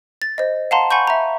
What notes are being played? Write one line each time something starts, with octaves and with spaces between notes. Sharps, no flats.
A6
C5 D#5
F5 F#5 A5 A#5 C6
F#5 G#5 B5 C#6 G6
E5 A#5